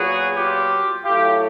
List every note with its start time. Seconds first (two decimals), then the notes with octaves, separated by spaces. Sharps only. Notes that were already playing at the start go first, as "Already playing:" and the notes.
Already playing: A#2 F#3 B3 F#4 G#4
0.36 F4 G4
1.03 A2 F#3 A3 F4 G4